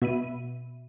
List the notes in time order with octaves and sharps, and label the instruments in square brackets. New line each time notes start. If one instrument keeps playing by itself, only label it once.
[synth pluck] B2 E5 B5 D#7